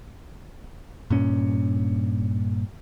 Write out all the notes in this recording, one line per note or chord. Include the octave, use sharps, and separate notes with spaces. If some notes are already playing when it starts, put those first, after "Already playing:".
G2 A#2 C#4